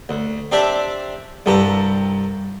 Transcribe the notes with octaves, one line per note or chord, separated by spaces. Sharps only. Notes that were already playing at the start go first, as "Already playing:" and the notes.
D2
C4 D4 G4 D5 E5 A5
C2 G2 G4 A4 A#5